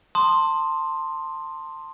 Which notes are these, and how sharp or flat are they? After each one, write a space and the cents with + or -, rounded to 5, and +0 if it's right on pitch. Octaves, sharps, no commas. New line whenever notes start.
A5 +30 C6 +10 D#6 -15